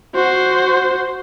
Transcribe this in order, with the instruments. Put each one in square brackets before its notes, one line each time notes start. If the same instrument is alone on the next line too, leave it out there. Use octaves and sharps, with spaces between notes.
[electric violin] F#4 C5